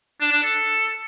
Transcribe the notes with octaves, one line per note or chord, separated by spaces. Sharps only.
D4
D4
A4